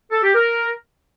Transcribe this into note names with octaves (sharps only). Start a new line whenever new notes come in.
A4
G4
A#4